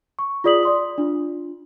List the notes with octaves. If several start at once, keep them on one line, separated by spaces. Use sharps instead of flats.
C#6
F4 G#4 D5 D#6 B6 F#7
D5 C6 D#6
D4 F4